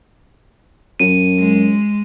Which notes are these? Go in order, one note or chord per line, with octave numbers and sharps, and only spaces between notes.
F#2 D#7
G#3